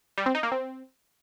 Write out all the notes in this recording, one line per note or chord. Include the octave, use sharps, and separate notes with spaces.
G3
C4
D#4
A#3
C4